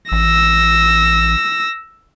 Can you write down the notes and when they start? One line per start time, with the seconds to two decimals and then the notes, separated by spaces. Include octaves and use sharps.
0.12 A1 E6 A#6